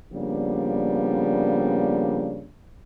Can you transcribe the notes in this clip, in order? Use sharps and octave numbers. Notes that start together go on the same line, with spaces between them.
C#3 F3 G3 A#3 B3 D4